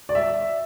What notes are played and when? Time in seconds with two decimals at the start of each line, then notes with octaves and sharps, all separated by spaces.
0.09 D5
0.15 E5